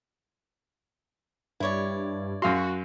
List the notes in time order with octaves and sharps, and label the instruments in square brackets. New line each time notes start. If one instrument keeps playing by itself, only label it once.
[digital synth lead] G2 [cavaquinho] E4 C#5 D5
[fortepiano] F#2 F5 C6 [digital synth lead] F#4